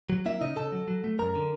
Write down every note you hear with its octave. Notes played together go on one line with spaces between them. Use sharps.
F#3
A#3 E4 E5
C#3 D#4 D#5
C#3 A4 A5
F#3
F#3
A3
F#2 A#4 A#5
D3